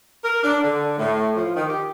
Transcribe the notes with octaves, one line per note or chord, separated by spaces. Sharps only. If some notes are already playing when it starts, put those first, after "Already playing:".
A#4
D4
D3
A2
F3
D#3
G4